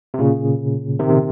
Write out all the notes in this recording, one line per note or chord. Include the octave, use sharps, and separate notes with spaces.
C3
A#2 C#3
C3 D#3